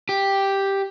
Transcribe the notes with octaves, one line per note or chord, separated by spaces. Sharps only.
G4